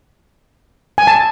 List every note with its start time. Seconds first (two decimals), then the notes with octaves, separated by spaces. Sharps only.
0.98 G#5
1.07 A5